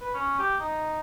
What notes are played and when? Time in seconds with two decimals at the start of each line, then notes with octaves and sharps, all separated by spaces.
0.01 B4
0.14 C#4
0.39 G4
0.60 D#4